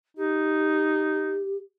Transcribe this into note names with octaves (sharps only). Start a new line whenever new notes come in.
D#4 G4